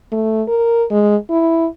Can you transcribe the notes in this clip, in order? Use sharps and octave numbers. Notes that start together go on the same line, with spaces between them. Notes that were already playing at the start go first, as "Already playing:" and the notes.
A3
A#4
G#3
E4